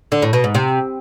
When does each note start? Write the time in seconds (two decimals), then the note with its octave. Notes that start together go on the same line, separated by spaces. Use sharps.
0.12 D3
0.22 A2
0.33 B2
0.44 G#2
0.54 C3